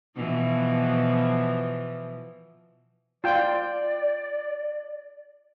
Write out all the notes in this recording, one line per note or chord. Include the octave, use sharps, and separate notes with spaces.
B2 E3 F3
F4 D5 G5